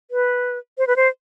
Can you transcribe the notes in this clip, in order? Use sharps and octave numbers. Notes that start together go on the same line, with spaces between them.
B4
C5
B4
C5